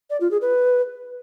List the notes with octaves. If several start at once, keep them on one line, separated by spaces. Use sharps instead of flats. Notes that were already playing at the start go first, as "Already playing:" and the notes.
D5
F4
G#4
B4